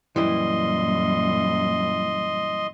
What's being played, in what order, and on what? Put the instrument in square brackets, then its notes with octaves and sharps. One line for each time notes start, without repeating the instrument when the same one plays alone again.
[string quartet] F#2 A#2 [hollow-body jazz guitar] E3 G3 E4 [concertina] D#5 C6